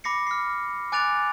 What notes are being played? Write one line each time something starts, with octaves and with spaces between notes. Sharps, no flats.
B5 D6 A#6 C7 C#7
F6 C7
G#5 D6 F#6 A6 D7 F7